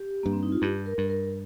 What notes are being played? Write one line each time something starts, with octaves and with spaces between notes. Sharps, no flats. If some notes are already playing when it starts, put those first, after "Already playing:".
Already playing: G4
G2 A#3
C4
D#4
F4
G2 G4
A#4
G2
A#4